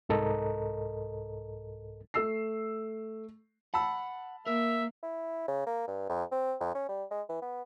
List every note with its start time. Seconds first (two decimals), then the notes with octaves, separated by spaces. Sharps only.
0.09 C2 G#2 A4 A#4 D#5 A#5
2.14 A3 E6 C7
3.74 F#5 A5 B5 E6
4.47 A#3 A#4 E5
5.03 E4
5.48 C#3
5.66 A#3
5.88 G2
6.09 F2
6.32 C4
6.60 F2
6.75 C#4
6.89 G3
7.11 G#3
7.29 E3
7.42 B3